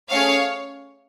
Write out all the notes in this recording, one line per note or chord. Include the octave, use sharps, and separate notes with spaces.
A3 C#4 G#4 C#5 F5